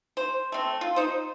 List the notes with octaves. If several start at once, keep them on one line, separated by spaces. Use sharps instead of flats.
C5
A3 C4
F4
D#4 C5